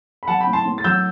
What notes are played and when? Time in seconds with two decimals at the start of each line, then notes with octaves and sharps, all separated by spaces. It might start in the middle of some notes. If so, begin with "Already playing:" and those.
0.23 B5
0.27 F#3 F#5 A5
0.40 G5 B5
0.47 A2
0.53 A5 C6
0.65 A2
0.78 A6
0.84 F#3 E6 G6